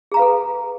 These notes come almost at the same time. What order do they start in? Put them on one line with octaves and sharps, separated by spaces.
G#4 A#5 F5 B4 A4